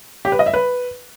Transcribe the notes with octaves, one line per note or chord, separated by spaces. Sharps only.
G4
B4
D#5
E5
B4